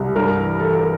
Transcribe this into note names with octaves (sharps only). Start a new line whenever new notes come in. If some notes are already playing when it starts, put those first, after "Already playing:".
Already playing: C2
G2 A#4
E3
E3 A4
A#4